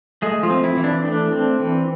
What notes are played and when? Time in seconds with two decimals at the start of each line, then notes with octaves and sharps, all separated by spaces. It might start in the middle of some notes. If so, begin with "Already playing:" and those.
0.22 G#3 A3 G#4
0.43 F3 F4
0.50 C4
0.64 E4
0.77 E3
0.84 D4
1.05 A3 D4
1.32 C4
1.60 E3